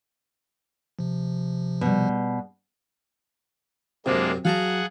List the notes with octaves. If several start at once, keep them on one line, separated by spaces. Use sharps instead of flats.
C3 F3
B2 G3
F#2 C3 G#3 A#3 C4 D4
F#3 G#4 F5 F#5 A5 A#5